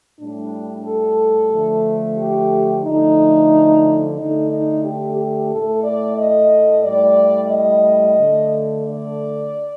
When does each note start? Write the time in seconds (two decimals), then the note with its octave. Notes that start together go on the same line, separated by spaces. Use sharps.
0.20 A2 G3 D4
0.86 A4
1.52 D3 F3 A3
2.19 G4
2.85 D3 F3 A3 D#4
4.18 D3 A3 D#4
4.51 D#4
4.85 G4
5.18 G4
5.51 A2 A3 A4
5.84 D5
6.18 D#5
6.84 A2 G3 D5
7.50 D#5
8.17 D3 A3
8.84 D5